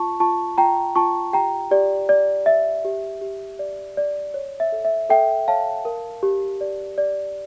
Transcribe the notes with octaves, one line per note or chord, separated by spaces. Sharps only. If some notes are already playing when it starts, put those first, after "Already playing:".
Already playing: F4 A5 C#6
F4 A5 C#6
F4 G5 A#5
F4 A5 C#6
G4 G5 A#5
G4 D5
D5
D5 E5
G4
G4
D5
D5
C#5
E5
A4
E5
A4 E5 G5
C#5 F5 A5
A#4
G4
D5
D5